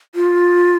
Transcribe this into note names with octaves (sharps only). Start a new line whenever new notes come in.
F4